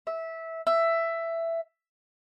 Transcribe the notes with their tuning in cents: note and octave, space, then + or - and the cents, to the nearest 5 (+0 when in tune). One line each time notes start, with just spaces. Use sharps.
E5 -15
E5 +10